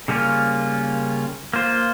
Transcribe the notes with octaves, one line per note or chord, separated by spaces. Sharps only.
C#3 G3 A#3 C#4 F4
A#3 F4 C5